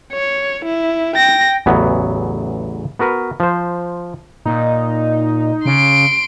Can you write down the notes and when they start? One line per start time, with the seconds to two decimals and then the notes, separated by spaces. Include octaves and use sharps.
0.13 C#5
0.65 E4
1.16 G5 A#6
1.66 A1 E2 C#3 E3 F#3 B3
2.99 B3 F#4 A#4 B4
3.40 F3 C5
4.46 A#2 D#4
5.66 C#3 C6 D7